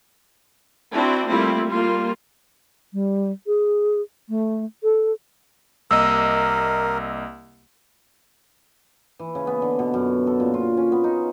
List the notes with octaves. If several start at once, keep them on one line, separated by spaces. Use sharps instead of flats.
C4 D4 E4 F#4
G3 A3 A#3 C4 E4 F4
G3 A#3 F4
G3
G#4
A3
A4
C2 A#3 A#4 D#5 E6
E3
C#3
B3
D3
B2
F#2
A4
A#2
F4
C#4
B3
D#4